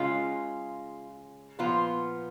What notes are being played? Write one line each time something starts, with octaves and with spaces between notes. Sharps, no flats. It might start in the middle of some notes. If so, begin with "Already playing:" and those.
Already playing: C#3 G#3 C#4 F4
A#2 F3 B3 F4